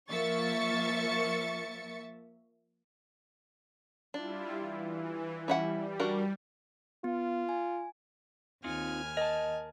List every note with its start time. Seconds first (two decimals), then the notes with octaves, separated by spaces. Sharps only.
0.10 F3 A#3 E5 C#6 A6 C#7
4.14 G3 D4 E4 F4
4.58 E3
5.48 G3 C#4 E4 F#5
6.00 D4 F#4 A#4
7.04 B3 F4
7.49 G#5
8.64 D#2 C4 D#4 F4 G#5 F6
9.17 A#4 D#5 A5